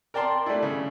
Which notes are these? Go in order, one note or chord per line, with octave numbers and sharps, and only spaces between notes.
A#4 D5 G5 A5 C6
G3 A3 D4 E4
C#3